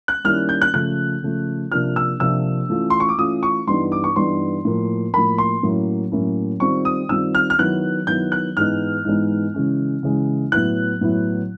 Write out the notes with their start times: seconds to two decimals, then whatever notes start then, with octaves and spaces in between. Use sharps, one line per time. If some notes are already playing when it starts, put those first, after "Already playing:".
0.08 F#6
0.24 D#3 G3 A#3 C#4 E4 F6
0.49 G6
0.62 F#6
0.74 C#3 F3 A3 F#6
1.23 C#3 F3 A3
1.71 C3 F3 A#3 D4 F4 F6
1.96 E6
2.20 C3 F3 A#3 D4 F4 E6
2.69 E3 A3 C#4 F4
2.90 C6
3.00 C#6
3.09 D6
3.18 E3 A3 C#4 F4 D#6
3.43 C#6
3.67 G2 E3 G3 B3 D#4 C6
3.92 D6
4.04 C#6
4.16 G2 E3 G3 B3 D#4 C6
4.65 A2 F3 A#3
5.14 A2 F3 A#3 B5
5.38 C6
5.63 A2 F#3 A#3 C#4 E4
6.12 A2 F#3 A#3 C#4 E4
6.60 D#3 G3 C4 F4 C#6
6.85 D#6
7.09 D#3 G3 C4 F4 E6
7.35 F6
7.50 F6
7.58 D#3 F#3 B3 E4 F#6
8.07 D#3 F#3 B3 E4 G6
8.32 F#6
8.57 G#2 E3 G#3 B3 D#4 F6
9.05 G#2 E3 G#3 B3 D#4
9.54 C#3 E3 G#3 C#4
10.03 C#3 E3 G#3 C#4
10.52 A2 F#3 B3 E4 F#6
11.01 A2 F#3 B3 E4